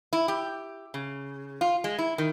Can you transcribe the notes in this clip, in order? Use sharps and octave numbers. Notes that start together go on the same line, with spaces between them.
E4
G4
C#3
F4
G#3
E4
D#3